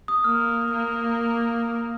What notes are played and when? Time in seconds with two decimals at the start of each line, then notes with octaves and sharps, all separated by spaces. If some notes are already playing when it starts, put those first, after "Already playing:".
0.08 D#6
0.24 A#3 F6
0.73 A#3